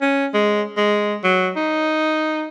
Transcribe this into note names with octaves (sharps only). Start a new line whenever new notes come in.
C#4
G#3
G#3
F#3
D#4